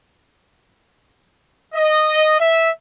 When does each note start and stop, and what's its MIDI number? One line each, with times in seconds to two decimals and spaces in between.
1.74 2.34 75
2.38 2.69 76